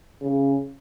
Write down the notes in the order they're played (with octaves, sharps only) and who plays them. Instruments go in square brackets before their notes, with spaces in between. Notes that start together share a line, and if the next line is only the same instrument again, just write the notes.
[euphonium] C#3